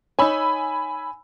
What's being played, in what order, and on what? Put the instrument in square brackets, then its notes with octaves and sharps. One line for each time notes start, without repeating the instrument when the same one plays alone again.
[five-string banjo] D#4 C#5 [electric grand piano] G#5 B5 E6